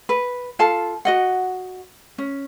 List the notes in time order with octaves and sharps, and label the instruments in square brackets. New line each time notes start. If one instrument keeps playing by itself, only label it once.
[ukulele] B4
F4 A4 F5 A5
F#4 D#5 F#5
C#4